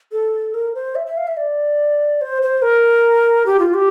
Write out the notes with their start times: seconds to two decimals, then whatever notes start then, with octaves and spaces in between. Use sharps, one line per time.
0.12 A4
0.54 A#4
0.75 C5
0.95 E5
1.06 E5
1.17 F5
1.27 E5
1.37 D5
2.21 C5
2.42 C5
2.62 A#4
3.46 G4
3.59 F4
3.74 G4